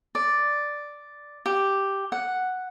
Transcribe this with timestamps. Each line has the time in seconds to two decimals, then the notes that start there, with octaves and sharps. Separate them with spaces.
0.15 D5
1.46 G4
2.12 F#5